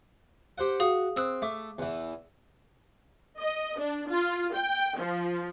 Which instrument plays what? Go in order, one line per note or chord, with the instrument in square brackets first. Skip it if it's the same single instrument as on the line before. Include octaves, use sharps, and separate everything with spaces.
[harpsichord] G4 C5 F#5
[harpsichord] F#4 [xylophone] G#4 F5 D#6
[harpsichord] C4 [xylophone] D#6 E6 F#6
[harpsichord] A3 [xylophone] E5 D6
[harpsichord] E2 E3
[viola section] D#5
D4
F4
G5
F3